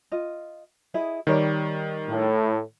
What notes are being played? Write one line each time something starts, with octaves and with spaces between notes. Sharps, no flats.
F4 D#5
E4 G#4 D#5
D#3 G3 A#4 C#5 D5
A2